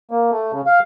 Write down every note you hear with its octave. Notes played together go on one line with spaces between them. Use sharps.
A#3
A3
C#3
F5